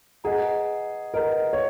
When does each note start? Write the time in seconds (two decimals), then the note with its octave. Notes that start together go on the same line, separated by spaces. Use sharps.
0.24 G#4 B4 D#5 F#5 A#5
1.14 A#4 B4 D#5 F#5 A#5
1.53 C#5